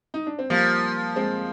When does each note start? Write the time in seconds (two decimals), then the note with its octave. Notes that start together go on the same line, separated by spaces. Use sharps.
0.14 D#4
0.27 D4
0.39 C4
0.50 F3 G3 A#3
1.16 G#3 C4